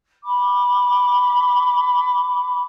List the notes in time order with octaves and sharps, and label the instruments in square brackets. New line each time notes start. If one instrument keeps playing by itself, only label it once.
[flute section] B5 D6